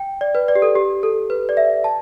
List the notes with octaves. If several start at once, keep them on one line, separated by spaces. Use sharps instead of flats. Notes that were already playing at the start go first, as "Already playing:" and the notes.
Already playing: G5
D5
B4
D5
G4
A4
G4
A4
B4
D5
E5
A5